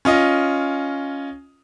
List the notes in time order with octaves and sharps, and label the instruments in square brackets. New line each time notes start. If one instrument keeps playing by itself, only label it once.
[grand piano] C#4 F4 D#5